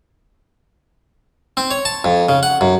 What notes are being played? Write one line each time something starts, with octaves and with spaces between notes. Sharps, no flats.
C4
C#5
A5
F2
C#3
F#5
F#2